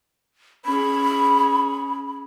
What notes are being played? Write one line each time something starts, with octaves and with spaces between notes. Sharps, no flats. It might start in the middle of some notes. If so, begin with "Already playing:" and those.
C#4 G#4 B5